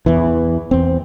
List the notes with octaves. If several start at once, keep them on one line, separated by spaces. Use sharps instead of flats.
E2 E3
E2 C4